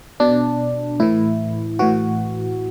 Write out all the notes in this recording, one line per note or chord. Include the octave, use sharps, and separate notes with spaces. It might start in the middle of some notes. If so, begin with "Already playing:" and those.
B2 D4
A2 E3 E4
A2 E3 F#4